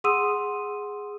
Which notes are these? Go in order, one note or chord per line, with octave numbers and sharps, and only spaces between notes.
G#4 F#5 C6 D#6 E6 D#7